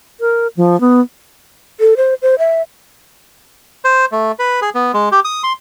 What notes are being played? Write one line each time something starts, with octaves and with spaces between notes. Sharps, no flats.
A#4
F3
B3
A4
C5
C5
E5
C5
A3
B4
G#4
B3
G#3
G4
D#6
C6